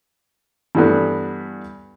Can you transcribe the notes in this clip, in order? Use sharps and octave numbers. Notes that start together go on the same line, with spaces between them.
G2 E3 G3 A3 B3 D4